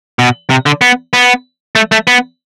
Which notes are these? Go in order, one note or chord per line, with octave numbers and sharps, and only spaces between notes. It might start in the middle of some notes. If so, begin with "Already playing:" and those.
B2
C3
D3
B3
B3
A3
A3
B3